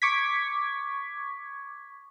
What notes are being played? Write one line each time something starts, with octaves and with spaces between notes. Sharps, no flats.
C#6 D6 G#6 B6